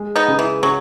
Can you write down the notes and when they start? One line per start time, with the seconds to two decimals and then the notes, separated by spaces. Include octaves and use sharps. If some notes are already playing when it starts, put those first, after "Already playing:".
Already playing: G#3
0.16 B3 D#4
0.28 C#3
0.39 E3
0.63 C#3 F#3